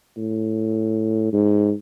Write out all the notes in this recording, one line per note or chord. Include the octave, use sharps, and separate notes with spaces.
A2
G#2